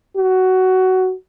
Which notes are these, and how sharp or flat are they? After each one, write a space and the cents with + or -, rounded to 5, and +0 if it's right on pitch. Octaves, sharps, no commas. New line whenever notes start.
F#4 +15